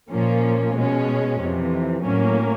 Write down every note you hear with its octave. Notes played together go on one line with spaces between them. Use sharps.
A#2 F3 A#3 C#4
B2 G#3 C#4
F2 C3 E3
A2 F#3 A#3 C#4